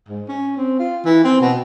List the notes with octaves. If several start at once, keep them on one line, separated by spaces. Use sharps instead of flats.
G#2
C#4
C4
F4
E3
C4
B2